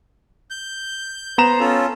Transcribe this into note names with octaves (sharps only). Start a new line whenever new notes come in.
G6
B3 C5 A#5 E7
C#4 F4 A4